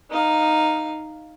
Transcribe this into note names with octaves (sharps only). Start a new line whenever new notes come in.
D#4 F5